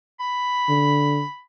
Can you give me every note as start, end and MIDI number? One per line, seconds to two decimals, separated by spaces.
0.20 1.40 83
0.69 1.23 50